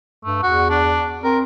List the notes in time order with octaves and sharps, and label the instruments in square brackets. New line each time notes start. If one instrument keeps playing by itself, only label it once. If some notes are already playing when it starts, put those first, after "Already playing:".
[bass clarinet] G2 [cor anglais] A3
[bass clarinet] E2 [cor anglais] F#4
[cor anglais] D4
[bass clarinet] C4 [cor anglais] A#4